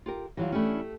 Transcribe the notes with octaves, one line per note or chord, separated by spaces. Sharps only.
F4 G4 A#4
E3 F#3 G3 E4 F4
A3 C#4 D4 E4 G4